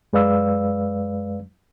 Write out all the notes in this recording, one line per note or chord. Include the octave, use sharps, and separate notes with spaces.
F#2 G#3 B4 D5 F5 E6